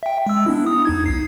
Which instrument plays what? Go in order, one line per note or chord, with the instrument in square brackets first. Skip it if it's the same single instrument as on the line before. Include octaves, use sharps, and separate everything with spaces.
[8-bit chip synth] E5 G5
G#3 E6
B3 D4 E4
D#6
E2 D#4 G#6
B1 C7